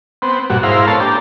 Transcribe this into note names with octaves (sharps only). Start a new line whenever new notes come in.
B3 C4
G2 A#2 F#4
G#2 E4 A#4 C5 F5
B3 A4 C#5 A5 C6
A#3 D4 G4